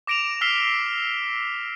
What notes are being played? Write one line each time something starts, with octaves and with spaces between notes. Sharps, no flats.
D6 A#6 D7 E7 F7
E6 F6 B6 C7 G7